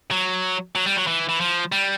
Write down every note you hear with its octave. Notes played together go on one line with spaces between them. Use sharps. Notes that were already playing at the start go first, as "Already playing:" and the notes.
F#3
F#3
G3
F#3
E3
E3
F3
G3